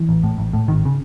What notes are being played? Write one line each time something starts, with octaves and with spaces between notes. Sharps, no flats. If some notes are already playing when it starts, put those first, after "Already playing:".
Already playing: E3
A1
A2
A1
A2
G#1 D#3
C#3